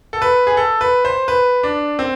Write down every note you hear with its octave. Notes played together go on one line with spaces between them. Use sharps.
A4
B4
G#4
A4
B4
C5
B4
D4
C4